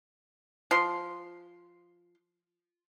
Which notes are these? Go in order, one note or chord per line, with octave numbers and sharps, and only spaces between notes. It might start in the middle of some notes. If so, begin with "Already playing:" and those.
F3 C6